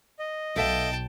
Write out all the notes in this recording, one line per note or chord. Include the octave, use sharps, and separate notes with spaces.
D#5
B1 A4 E5 F5 G5 A5